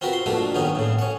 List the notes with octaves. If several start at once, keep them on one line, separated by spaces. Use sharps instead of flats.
C4 F4 F#4 A#4 B4
C6
G2 B2 A3 A#3 F4 F#4
G2 D#3 B3 C#4 D#4
A2 C#3
C#4 F#5